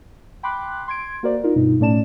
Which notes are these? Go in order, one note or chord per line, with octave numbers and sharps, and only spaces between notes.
G5 B5 C6 D6 F#6
C6 G#6 D7
A#3 F#4 A#4 C5 D5
D#4 F4 A#4
G2 B2 D#4 F4
A2 A3 C#4 D5 A5 E7